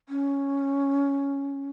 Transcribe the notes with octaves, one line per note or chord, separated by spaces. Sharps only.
C#4